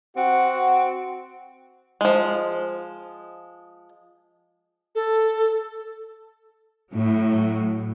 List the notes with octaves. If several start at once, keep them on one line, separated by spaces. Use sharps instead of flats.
C4 F#4 F#5
F3 G#3
A4
A2 F#3